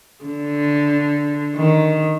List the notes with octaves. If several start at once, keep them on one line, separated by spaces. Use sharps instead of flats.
D3
D#3